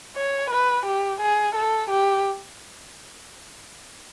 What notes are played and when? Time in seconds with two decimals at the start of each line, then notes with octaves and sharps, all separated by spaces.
0.16 C#5
0.51 B4
0.86 G4
1.21 G#4
1.55 A4
1.90 G4